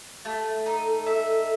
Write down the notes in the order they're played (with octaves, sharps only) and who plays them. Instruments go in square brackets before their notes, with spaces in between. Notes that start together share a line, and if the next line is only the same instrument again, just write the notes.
[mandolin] A3 [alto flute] A4
[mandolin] D#4
E5